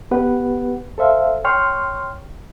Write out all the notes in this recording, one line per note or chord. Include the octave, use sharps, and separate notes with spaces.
B3 G4 B4 F#5
A4 C5 E5 F5
C#5 G5 C6 C#6 F6